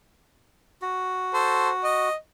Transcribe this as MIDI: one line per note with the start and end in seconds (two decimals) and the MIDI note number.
0.82 2.09 66
1.34 1.70 69
1.34 1.70 72
1.84 2.15 75